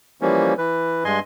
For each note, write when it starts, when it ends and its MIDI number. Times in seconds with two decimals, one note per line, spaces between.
0.21 0.54 52
0.21 0.54 53
0.21 0.54 55
0.21 0.54 58
0.21 0.54 61
0.58 1.04 52
0.58 1.04 71
1.05 1.20 43
1.05 1.20 56
1.05 1.20 75
1.05 1.20 80
1.05 1.20 84